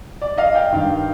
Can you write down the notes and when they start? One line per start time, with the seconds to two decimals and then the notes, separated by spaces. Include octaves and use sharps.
0.22 D5
0.38 D#5 F5
0.55 F5 G5
0.72 G2 D#3